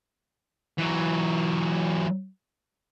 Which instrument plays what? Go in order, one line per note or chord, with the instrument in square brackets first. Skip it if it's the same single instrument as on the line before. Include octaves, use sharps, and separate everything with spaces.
[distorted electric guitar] E3 F#3